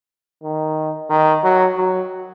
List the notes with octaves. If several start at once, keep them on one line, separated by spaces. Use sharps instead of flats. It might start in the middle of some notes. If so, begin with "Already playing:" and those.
D#3
D#3
F#3
F#3